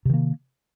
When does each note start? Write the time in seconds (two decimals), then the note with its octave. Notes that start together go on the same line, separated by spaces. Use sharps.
0.05 C3
0.10 D#3
0.14 A#3